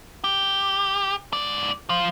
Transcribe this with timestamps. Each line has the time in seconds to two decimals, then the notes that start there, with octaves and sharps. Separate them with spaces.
0.24 G4
1.33 G#2 D5
1.89 F3 F4